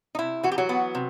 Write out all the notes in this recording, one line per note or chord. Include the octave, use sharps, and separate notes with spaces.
D#4
C3 E4
E3 F#4
G4
F#3 F#4
B3
C3